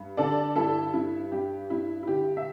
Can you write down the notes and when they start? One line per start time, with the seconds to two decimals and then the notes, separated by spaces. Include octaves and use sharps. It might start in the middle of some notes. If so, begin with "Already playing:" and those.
Already playing: G2
0.17 D3 A4 D5
0.56 G2 E4 A4
0.93 G2 E4
1.31 G2 G4
1.70 G2 E4
2.03 E4
2.07 D3 G4
2.37 E5